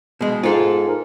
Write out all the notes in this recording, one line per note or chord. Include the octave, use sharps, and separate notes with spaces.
B2 G#3
G#2 F4 A4
A#4